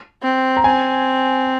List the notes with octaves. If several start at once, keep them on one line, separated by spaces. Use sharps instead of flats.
C4
A#5
C4 G#5